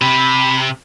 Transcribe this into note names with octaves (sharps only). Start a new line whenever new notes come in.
C3 B5